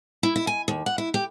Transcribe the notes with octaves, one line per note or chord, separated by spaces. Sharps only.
E4
E4
G#5
D#2
F#5
E4
G4